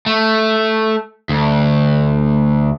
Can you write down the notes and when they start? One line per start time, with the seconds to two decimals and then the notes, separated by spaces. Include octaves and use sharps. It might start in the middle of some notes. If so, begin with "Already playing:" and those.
0.06 A3
1.29 D2